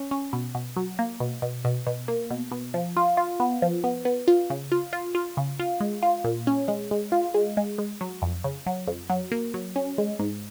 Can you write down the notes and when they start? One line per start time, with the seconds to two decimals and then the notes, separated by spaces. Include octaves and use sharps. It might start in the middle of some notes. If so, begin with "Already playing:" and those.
Already playing: C#4
0.11 C#4
0.33 B2
0.55 B2
0.76 F#3
0.99 A#3
1.20 B2
1.42 B2
1.65 B2
1.87 B2
2.08 A#3
2.31 B2
2.51 B2
2.74 F3
2.97 F4
3.17 F4
3.40 B3
3.62 F3
3.84 B3
4.05 B3
4.28 F4
4.50 C#3
4.72 F4
4.93 F4
5.15 F4
5.37 C#3
5.60 F4
5.80 G#3
6.03 F4
6.24 A#2
6.47 C#4
6.68 G#3
6.91 G#3
7.12 F4
7.34 G#3
7.57 G#3
7.78 G#3
8.01 F#3
8.22 F2
8.44 C#3
8.66 F#3
8.87 F2
9.10 F#3
9.32 A#3
9.54 F#3
9.76 C#4
9.98 G#3
10.19 G#2